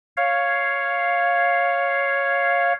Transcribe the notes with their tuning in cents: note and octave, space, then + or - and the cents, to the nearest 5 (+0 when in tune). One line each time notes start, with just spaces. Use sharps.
C#5 +0 F5 +0